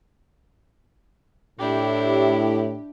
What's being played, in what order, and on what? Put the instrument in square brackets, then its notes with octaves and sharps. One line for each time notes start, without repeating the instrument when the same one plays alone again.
[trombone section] A2 [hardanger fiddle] D4 E4 [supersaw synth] G4